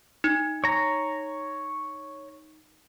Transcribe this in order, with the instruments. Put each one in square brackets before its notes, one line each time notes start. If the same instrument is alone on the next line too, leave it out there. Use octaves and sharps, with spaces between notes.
[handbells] D#4
[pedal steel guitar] C#5 A#5